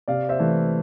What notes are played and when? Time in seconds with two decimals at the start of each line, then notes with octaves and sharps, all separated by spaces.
0.08 C3 D5 F5
0.29 C5 E5
0.39 E3 A3